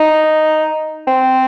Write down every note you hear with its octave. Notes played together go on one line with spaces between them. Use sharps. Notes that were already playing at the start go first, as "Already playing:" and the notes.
Already playing: D#4
C4